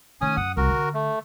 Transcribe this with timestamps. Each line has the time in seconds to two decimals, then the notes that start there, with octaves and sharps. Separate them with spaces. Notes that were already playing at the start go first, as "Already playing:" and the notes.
0.21 D#3 A3 C#4 G#5 D#6
0.37 F#2 F#5 D#6
0.57 C2 F#4 A#4
0.70 D3
0.94 A3